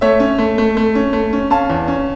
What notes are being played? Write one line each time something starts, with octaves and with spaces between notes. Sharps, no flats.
A3 C#5 E5
C#4
A3
A3
A3
C#4
A3
C#4
C#4 F5 A5
E2
C#4